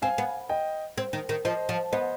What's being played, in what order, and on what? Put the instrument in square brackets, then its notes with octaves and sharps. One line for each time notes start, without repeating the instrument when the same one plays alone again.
[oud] C4 [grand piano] F5 G#5
[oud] B3
[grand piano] D#5 G5
[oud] C4
D#3
D#3
[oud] F3 [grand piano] C5 D#5
[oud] F3
[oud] B3 [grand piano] C5 D#5